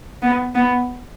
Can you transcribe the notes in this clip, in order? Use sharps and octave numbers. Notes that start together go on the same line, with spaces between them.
B3
B3